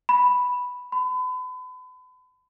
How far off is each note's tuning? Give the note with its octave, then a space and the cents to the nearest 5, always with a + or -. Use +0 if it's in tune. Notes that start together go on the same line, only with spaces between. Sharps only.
B5 +0
B5 +40